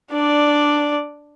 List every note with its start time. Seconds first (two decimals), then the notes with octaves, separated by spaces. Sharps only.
0.11 D4 D5